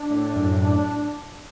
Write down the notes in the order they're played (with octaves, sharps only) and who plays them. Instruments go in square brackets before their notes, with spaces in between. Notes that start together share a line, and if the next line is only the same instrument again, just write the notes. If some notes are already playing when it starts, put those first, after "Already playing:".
Already playing: [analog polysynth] D4
A2
F#2
D4